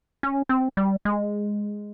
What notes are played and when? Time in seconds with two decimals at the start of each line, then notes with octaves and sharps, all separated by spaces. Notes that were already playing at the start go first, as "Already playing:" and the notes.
0.23 C#4
0.49 C4
0.77 G3
1.05 G#3